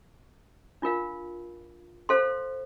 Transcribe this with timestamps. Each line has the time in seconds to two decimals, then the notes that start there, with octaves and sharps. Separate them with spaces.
0.82 D4 F4 A#4 F5
2.09 A4 C5 F5 C6